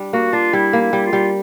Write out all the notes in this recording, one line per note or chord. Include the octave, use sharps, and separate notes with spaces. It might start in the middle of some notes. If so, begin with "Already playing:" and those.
Already playing: G3 D4
A#3 F#4
D4 F4
G3 E4
A#3
E4
G3
F4
G3